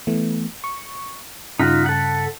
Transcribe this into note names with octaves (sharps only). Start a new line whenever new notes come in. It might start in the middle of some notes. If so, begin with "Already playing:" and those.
E3 A3 B3
C#6
G2 C#3 D#4 F4 F#4 B6
A4 F#5